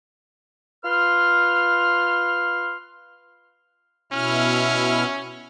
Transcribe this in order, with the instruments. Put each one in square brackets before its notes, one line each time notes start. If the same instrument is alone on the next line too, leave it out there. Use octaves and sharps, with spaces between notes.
[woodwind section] F4 B4 C6 F6
[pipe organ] B2 E4 F6 [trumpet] C#4